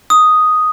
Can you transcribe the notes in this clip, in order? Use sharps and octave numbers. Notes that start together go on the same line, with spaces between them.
D#6